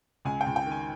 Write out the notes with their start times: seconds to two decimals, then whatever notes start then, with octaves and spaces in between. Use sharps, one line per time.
0.25 C#2 G#5
0.41 G5
0.46 C#2
0.56 G5
0.66 D#3
0.71 G#5